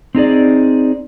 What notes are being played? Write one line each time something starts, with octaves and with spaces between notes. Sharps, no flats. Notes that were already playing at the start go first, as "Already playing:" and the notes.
C4 D#4 G#4 D5